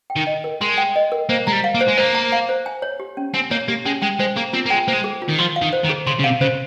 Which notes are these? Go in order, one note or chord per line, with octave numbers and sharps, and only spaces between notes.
G5
D#3
D#5
A#4
G#3 C6
G5
D#5
A#4
A#3 C5
G#3 A#5
G3
F5
A#3
C5
G#3
A#3 C5
A#5
F5
C5
G#5
C#5
G4
C#4
C4 G#5
A#3 C#5
A#3 G4
G#3 C#4
G#3 G5
G#3 C5
A#3 G#4
C4 F4
A#3
G#3 G5
A#3 C5
G#3
G#4
F4
D#3
F3 C6
F5
D#3
C5
D#3
G#4
C#3 C6
C#3
C3 F5
C#3 C5